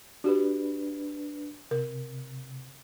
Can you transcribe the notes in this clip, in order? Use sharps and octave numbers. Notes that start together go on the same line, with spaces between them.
D4 F#4 G4 B4
C3 A#4